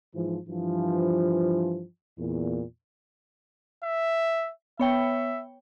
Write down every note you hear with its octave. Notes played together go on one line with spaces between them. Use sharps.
G#2 E3 F3
G2 E3 F3
E2 A#2
E5
B3 C#5 E5 G5